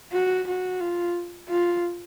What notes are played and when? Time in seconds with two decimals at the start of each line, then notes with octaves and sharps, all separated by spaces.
0.13 F#4
0.47 F#4
0.80 F4
1.49 F4